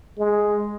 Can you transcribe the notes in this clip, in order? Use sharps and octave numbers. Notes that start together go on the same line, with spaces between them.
G#3